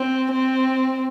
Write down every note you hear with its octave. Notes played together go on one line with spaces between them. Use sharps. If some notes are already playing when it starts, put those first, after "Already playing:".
Already playing: C4
C4